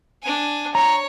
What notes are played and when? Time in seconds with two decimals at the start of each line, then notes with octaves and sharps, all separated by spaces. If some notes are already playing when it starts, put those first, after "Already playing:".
0.23 D4 G#5
0.75 C#5 A#5